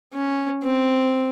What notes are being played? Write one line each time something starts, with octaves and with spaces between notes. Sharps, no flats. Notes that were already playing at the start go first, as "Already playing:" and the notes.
C#4
C4